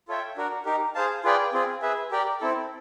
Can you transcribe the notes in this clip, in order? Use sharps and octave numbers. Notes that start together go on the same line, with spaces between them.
F4 A4 C#5 E5 G5
D4 F#4 A#4
D#4 G4 A#4
G#4 C5 F5 A5
F4 G#4 B4 D5 G5
C4 F4 G#4
G#4 B4 E5
G4 A#4 D5 G5
C4 E4 A4